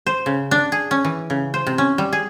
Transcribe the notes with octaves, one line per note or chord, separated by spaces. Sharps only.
C5
C#3
D4
G#4
C#4
E3
C#3
C5
C3
C#4
G3
G#4